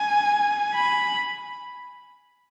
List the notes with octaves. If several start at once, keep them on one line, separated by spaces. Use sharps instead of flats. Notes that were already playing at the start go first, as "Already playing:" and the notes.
Already playing: G#5
B5